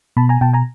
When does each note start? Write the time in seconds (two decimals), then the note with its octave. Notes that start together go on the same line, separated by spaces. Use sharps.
0.17 B2 A5 B5
0.29 G#5 A#5
0.41 B2 G5 A5
0.53 G#5 A#5